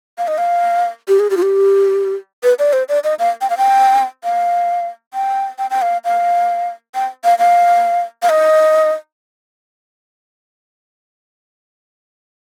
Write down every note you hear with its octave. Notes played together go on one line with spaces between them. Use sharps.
F5
D#5
F5
G4
G#4
G4
F4
G4
B4
D5
C5
D5
D#5
F5
G5
F5
G5
F5
G5
G5
G5
F5
F5
G5
F5
F5
F5
D#5